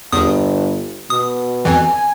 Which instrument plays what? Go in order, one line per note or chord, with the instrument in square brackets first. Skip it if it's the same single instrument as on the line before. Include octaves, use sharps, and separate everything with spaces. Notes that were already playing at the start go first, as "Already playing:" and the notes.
[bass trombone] G1 [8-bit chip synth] E2 D#6
[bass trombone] B2 [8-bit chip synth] D#6
[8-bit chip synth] F2 E3 [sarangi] G#5